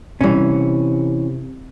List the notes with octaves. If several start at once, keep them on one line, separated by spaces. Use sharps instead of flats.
B1 C3 E3 G3 C#4